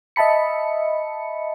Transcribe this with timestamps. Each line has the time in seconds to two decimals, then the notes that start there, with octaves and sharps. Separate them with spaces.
0.16 D#5 E5 A5 B5 C#7